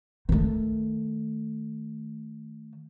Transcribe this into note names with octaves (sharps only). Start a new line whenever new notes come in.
D#3 A3